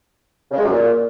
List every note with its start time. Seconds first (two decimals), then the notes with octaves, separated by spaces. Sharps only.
0.51 C#3
0.58 G#3
0.65 F#2
0.71 A#2